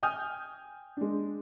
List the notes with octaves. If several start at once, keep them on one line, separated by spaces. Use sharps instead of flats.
G5 G#5 D#6 F6 G6
G#3 D4